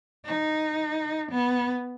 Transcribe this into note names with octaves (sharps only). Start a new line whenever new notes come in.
D#4
B3